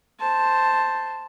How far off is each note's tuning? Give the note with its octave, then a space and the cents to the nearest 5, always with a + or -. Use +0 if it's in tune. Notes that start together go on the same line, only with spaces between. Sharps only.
C5 +0 A5 +5